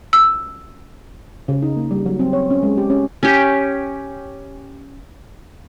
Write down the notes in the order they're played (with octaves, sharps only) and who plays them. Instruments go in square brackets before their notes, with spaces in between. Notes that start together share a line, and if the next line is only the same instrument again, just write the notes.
[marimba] E6
[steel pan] C#3
D#4
A#3
G3
F#3
C4
C#5
C#4
G#3
G4
C#4
[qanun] C#4 G4